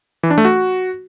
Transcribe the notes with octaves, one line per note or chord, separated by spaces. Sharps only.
E3
D4
A3
F#4